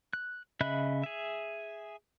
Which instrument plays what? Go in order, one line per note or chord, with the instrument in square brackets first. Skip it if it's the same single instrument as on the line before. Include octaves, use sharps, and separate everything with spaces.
[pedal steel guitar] F#6
C#3 D#5 E5 B5 F#6
G#4 E5